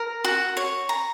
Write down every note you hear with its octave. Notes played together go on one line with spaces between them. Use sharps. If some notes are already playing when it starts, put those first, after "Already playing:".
Already playing: A#4
F#4
C#5
A#5